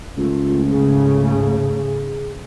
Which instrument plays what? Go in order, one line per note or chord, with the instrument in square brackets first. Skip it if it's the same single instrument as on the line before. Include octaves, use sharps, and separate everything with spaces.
[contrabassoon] C#2 [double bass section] A3 [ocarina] F4
[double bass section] G#2 C#3 A3 [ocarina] G#4